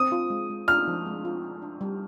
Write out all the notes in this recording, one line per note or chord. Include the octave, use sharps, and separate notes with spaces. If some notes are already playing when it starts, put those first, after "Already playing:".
Already playing: C4 D#6
F4
G#3
G#3
F4 F6
F3
G#3
F4
F4
D4
G3